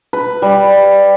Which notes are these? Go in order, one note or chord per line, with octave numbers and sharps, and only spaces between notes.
B4
G3